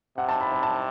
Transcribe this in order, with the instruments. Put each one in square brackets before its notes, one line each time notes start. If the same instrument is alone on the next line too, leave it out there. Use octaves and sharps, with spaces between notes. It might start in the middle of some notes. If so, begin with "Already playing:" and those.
[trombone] C3 [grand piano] F#5
[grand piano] A5
B5
B5
A5